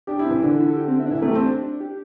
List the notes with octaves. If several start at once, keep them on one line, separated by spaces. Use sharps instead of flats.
D4 G4
E4
C4
E3
D3 D4
E4
A4
G4
C4
E4
D4
E3 E4
A3
G4
C4
D4
D4
G4